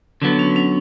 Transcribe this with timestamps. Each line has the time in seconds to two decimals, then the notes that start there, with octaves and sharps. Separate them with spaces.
0.22 D3 F#3 B3
0.39 C#4
0.56 C#4